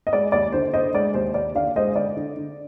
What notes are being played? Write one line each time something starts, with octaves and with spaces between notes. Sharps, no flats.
D#5
G#3 D5
D#2 D5
D3 C5
D3 C5 D#5
G#3 D5
D#2 C5
D#2 D5
D3 D5 F5
G#3 C5 D#5
D3 D5
D3
D3